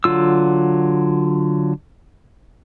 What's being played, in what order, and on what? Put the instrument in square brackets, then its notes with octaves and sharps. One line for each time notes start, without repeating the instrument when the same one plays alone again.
[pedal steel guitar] D3 F#3 F4 E6